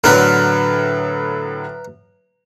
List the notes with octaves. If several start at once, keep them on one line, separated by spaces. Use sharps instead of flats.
A2 D3 F#3 A#4 B4